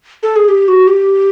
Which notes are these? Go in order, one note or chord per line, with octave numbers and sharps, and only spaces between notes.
A4
G#4
G4
F#4
G4